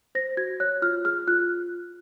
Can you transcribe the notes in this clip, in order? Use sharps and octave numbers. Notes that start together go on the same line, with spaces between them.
C5 A#6
F#4 G#6
C#5 F#6
F4 F6
G#4 F6
F4 F#6